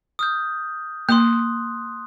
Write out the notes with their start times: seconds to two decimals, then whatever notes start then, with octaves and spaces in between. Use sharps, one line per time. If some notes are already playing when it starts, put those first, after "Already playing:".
0.19 D#6 F6 G6
1.09 A#3 C6 D#6 F#6